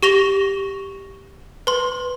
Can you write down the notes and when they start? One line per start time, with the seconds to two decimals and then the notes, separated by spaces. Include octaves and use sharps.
0.03 G4 C#6 A#6 F7
1.67 B4 C6